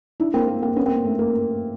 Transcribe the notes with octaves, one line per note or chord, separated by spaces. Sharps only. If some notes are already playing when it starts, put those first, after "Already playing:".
D4 E4
A#3 C4
A#3
A#3 C4
B3 C#4
A#3 C4
A3
A#3